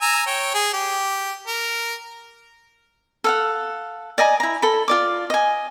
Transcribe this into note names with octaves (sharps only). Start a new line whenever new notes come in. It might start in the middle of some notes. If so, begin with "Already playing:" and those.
G#5 A#5 E6
C#5 G5
G#4
G4
A#4
A4 F5 F#5
D5 D#5 G#5 A#5
E4 A#5
A4 B5
F4 D5 D6
D#5 G#5